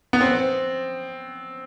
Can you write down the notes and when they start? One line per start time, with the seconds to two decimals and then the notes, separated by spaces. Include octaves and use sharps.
0.13 B3
0.21 C4